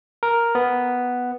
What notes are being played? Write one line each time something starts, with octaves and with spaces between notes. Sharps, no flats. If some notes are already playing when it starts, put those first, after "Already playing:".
A#4
B3